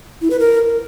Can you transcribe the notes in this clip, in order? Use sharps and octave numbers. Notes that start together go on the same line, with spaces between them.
E4
B4
A#4